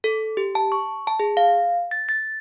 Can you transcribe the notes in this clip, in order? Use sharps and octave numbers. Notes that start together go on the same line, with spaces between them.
A4
G4
A5
C#6
A5
G#4
F5
A6
A6